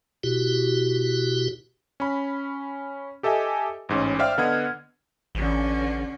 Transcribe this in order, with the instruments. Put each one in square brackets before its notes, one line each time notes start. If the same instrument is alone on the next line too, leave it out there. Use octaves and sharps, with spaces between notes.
[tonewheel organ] B2 E4 F#4 G4
[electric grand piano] C#4 B5
G4 A4 D#5 E5 G#5
A1 G#2 C#4
C5 D5 E5 F5 G5 F6
D3 B3 D#5 F#5 G#6
[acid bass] A1 [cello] D3 C#4